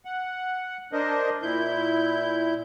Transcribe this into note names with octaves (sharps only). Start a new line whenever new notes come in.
F#5
D4 A#4 C5 D#5
A#2 E4 G6